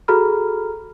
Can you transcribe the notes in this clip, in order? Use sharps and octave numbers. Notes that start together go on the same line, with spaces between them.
F#4 G#4 A4 A#5 B5 F6